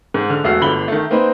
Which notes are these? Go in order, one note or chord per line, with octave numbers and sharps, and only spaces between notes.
G#2
D3 F6
E1 A3 F#4 E6 F6 C7
G1 D3 B5 F#7 G7
D#3 A3
A#3 C4 D#4 B4 C5